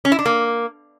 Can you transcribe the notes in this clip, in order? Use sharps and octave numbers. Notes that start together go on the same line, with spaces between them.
C#4
E4
D4
A#3